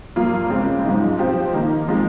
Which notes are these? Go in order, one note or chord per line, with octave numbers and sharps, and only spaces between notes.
G2 F3 A#3 F4
C#3 G#3 C4
G#2 F3 G#3 D#4
F3 C4 G4 C5
D#3 A#3 D#4
F3 G#3 C4